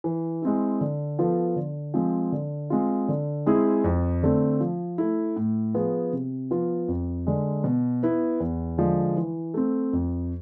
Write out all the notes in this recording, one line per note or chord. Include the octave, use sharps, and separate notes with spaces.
E3
G#3 C4 E4
D3
F3 B3 F4 A4
D3
F3 G#3 C4
D3
G#3 C4 F4
D3
G#3 C4 E4 G#4
F2
D3 A3 C4
F3
A3 E4
A2
F3 B3 F4 G#4
C3
F3 B3 F4
F2
D3 G#3
B2
B3 E4 B4
E2
D3 F3 G#3
E3
A3 C4
F2